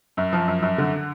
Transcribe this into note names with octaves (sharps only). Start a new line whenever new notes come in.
F#2
F3
F#2
F#2
D3